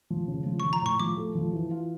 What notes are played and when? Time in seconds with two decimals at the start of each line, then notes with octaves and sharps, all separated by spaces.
0.10 F3
0.28 C#3
0.46 F3
0.60 C#6
0.64 F3
0.73 A#5
0.82 A2 C#6
1.00 F3 D6
1.17 A3
1.35 F3
1.53 E3
1.71 F4